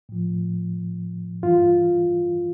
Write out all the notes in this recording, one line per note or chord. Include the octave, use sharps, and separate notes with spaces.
A2 F3
G2 E3 F4